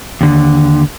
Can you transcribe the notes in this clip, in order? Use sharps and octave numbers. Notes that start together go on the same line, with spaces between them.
D#2 D3